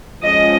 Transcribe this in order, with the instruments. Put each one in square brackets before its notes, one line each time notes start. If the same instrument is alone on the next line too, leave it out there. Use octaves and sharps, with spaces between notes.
[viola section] F3 G#3 C#4 D#5